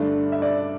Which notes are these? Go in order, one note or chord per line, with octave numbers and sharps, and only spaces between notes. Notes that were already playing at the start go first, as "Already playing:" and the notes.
Already playing: G2 D3 A3 D4 E5
E5
D5